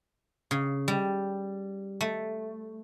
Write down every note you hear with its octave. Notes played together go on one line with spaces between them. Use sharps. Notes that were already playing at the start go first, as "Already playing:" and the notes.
C#3
G3
A3